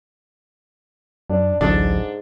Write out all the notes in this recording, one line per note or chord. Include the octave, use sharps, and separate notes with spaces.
F#2 D4
A1 D2 G#2 F#3 D4 A4